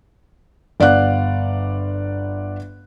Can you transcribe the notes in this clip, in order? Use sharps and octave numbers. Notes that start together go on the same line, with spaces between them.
G1 D5 F5 F#5 F#6